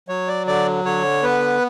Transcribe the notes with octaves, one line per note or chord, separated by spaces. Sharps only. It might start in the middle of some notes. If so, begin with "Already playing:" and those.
F#3 C#5
D5
D3 D5
D3 C#5
B3 B4